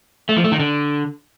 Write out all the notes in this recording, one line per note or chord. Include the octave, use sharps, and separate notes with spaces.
A3
F3
A3
D#3
D3